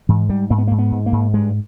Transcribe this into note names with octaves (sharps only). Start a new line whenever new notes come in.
G#2 E3
G#2 G3
G#2 A#3
B3
A#3
G#2
B3
G#2
A#3
G#2
G2 G#3